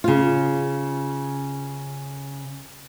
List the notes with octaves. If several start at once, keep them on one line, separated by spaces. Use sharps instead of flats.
C#3 F4